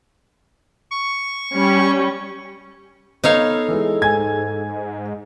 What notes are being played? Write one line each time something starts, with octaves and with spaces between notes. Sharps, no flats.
C#6
G3 C#4
B3 D#4 A4 C#5 F5
E3 G#3
G#2 G#5 G#6